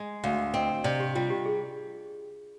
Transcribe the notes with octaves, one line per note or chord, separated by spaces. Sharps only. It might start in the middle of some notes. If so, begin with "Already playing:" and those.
Already playing: G#3
D2 F5
C4 D#5
C3 D5
G4
G3 F4
G4
G#4